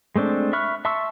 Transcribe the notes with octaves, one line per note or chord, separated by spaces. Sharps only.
G#3 A3 C4 D4
E5 B5 C#6 F6 F#6
E5 A5 C6 C#6 E6